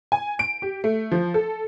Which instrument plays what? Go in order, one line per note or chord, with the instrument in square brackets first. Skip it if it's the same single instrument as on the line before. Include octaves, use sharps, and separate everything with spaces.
[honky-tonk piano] G#5
D7
G4
A3
F3
A4